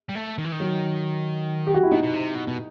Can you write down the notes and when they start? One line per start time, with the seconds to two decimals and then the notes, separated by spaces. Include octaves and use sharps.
0.09 G3
0.15 A3
0.38 D#3
0.44 E3
0.52 D#3
0.60 F#3
1.67 G4
1.74 F#4
1.83 E4
1.91 B2 D#4
2.03 B2
2.14 C3
2.35 B2
2.47 B2